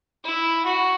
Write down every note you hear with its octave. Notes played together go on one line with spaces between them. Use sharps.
E4
F#4